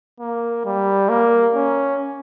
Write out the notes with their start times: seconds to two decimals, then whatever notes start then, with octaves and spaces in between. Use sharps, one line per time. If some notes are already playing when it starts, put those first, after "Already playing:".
0.20 A#3
0.65 G3
1.09 A#3
1.55 C#4